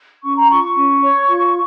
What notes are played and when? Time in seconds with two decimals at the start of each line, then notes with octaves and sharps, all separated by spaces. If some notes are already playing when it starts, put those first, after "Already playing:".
0.24 C#4 C#6
0.37 A#5
0.50 F4 C#6
0.64 C#6
0.76 C#4
1.02 C#5
1.28 F4